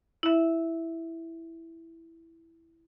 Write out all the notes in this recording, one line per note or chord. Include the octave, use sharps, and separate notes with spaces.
E4 E5